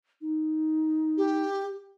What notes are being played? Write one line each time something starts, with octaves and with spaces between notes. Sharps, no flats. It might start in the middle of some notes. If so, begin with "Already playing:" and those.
D#4
G4